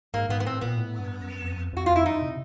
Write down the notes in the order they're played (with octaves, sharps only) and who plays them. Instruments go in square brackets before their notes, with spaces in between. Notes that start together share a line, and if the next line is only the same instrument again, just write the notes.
[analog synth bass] G#2 [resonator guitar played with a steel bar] A#3
[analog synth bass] G#2 [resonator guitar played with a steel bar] B3
[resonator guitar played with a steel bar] B3
[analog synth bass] A2 [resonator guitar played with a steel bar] C4
[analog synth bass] A#2 [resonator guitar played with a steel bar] B3
[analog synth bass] A2
G2
F#2
F2
F#2
F2
[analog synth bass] F2 [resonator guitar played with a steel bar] F#4
[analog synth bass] F2 [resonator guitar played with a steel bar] F4
[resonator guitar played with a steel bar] E4
[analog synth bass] F#2 [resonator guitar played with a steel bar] D#4
[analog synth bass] C3